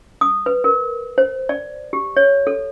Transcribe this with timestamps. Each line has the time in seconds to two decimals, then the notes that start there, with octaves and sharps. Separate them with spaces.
0.21 D#6
0.46 B4
0.64 A#4
1.18 C5
1.49 D5
1.93 G4
2.17 C#5
2.47 A4